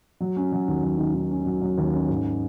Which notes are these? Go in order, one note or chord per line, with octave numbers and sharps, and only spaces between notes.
F#3
C#4
F#3
D#2
F#3
D#3
D#3
C#4
F#3
F#3
D#2
C#4
G#2